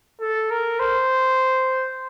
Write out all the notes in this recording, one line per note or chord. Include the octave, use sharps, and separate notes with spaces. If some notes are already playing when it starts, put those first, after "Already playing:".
A4
A#4
C5